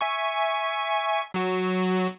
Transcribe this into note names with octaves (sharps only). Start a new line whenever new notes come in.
E5 G#5 C#6
F#3 F#4